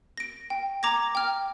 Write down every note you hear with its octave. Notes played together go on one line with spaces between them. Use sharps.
A#6 D7
G5
A#5 D6 G#6 A#6
G5 F6